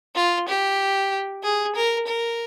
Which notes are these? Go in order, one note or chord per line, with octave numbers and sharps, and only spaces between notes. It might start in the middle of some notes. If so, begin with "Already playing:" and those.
F4
G4
G#4
A#4
A#4